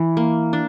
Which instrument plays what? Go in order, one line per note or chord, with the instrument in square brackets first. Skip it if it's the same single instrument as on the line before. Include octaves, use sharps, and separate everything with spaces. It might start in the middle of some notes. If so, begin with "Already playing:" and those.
Already playing: [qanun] E3
A#3
D4